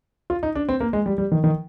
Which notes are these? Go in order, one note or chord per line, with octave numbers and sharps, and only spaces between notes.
F4
D#4
D4
C4
A#3
G#3
G3
G3
D#3
D#3